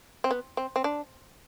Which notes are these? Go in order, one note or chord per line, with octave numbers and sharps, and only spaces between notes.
C4
B3
C4
C4
D4